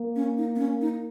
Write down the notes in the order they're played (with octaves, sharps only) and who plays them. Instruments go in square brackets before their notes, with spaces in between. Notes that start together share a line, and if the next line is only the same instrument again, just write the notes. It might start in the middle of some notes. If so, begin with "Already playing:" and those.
Already playing: [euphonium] A#3
[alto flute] C#4
D#4
B3
C#4
D#4